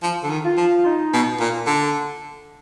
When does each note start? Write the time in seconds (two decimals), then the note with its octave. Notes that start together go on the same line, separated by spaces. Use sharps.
0.03 F3
0.23 D3
0.30 D#3
0.44 F4
0.57 F3
0.85 D#4
1.13 B2
1.40 A#2
1.67 D3